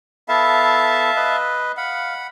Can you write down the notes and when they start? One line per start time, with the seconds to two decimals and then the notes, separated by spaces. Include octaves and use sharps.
0.29 B3 E4 A4 E5 F5 A5
1.16 B4 D#5
1.77 F5 F#5 B5